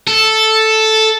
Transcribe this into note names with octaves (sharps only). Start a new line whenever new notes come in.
A4